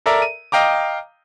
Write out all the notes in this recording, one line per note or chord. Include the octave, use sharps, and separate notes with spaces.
A4 A#4 D5 E5 A#5
D#7
D#5 F5 G5 A#5 D6